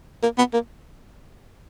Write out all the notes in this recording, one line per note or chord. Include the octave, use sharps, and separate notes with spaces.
A#3
B3
A#3